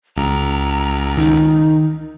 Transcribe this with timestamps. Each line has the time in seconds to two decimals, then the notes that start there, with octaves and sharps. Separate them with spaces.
0.17 C#2 A#5
1.18 D#3 D#4